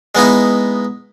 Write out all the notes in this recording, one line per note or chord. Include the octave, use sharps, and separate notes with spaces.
G#3 B3 D#4 E4